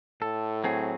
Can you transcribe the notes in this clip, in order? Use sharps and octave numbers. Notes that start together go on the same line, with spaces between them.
A2 A4
F#3 C4 G#4